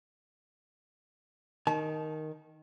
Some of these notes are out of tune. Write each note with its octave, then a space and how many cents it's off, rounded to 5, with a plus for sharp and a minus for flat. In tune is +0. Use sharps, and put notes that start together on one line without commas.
D#3 +0 A5 -35